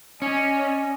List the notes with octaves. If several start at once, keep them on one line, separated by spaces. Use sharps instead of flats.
C#4 D5 D#5 G#5